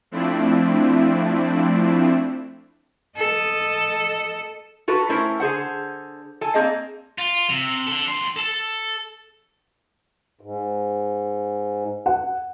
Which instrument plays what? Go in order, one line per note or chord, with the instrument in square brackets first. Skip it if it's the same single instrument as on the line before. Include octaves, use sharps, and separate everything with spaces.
[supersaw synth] F3 A3 C4 D4 E4
[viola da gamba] A4 D#5
[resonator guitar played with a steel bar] F4 F#4 A4 B4
A3 C#4 E4 A#4 C5
D3 G#4 C5 F#5
A4 G#5 A5
A#3 C4 G#4 D5 D#5
[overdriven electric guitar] F4
C3
D4 A4
D#2 C6
A4 A5
[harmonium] G#2
[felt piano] F#5